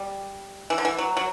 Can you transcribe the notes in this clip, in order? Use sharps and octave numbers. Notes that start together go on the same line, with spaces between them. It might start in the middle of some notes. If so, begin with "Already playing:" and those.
Already playing: G3
E3
D3
E3
F#3
F#3